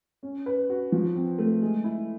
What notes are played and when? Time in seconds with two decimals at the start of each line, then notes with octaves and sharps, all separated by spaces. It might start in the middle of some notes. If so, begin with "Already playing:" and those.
0.23 C#4
0.46 B4
0.70 F#4
0.92 F3
1.15 C4
1.39 A3
1.62 G#3
1.84 E4